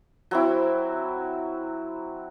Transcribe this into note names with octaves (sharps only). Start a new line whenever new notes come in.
F#3 C4 E4